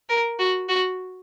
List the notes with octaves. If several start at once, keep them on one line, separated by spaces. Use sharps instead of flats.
A#4
F#4
F#4